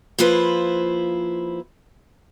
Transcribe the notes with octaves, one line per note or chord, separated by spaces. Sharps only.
F3 A#3 E4 F4 B4 C5